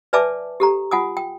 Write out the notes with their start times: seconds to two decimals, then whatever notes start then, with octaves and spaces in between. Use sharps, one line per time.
0.13 B4 D5 E5 G#5 A5 D6
0.60 G4 A4 A#5
0.91 F4 F#5 G#5 D#6
1.17 G5